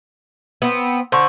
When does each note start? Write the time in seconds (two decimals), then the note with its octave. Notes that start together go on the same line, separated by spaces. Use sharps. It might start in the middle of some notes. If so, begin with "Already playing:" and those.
0.62 B3 C4
1.12 D3 C5 C6 C#6